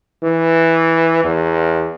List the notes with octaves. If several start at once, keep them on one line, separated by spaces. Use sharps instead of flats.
E3
E2